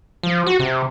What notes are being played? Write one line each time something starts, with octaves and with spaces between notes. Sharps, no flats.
F3
F#4
C3